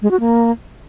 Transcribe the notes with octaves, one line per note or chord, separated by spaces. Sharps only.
G#3
F#4
A#3